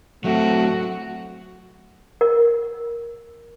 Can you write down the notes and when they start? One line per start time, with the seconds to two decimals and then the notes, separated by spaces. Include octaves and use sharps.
0.24 F#3 A3 C4 F#4
2.21 A#4